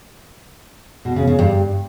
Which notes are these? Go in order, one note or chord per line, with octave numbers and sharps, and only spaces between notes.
B2
C#3
C#3
G2